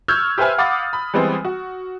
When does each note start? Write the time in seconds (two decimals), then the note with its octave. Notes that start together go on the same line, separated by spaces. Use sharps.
0.08 C#6 E6 F6 G6 G#6
0.38 G4 B4 C5 E5 G#5 F6
0.58 F5 F#5 B5 D6 D#6 A6
0.93 B5
1.14 E3 G3 G#3 B3 C4
1.45 F#4